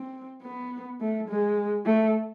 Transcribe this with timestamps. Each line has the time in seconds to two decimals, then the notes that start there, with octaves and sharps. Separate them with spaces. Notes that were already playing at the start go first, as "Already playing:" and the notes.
Already playing: C4
0.42 B3
1.00 A3
1.29 G#3
1.86 A3